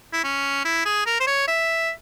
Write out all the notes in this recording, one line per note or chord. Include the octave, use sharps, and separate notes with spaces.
E4
C#4
E4
G#4
A#4
C5
C#5
E5